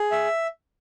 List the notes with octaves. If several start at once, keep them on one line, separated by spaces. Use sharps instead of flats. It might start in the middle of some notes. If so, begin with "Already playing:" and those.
Already playing: G#4
E5